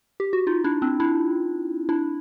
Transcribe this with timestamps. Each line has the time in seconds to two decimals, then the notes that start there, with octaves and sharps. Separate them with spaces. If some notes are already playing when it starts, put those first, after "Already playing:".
0.20 G4
0.33 F#4
0.47 D#4 F4
0.64 D4 E4
0.82 C4 D4
1.00 D4 E4
1.89 D4 E4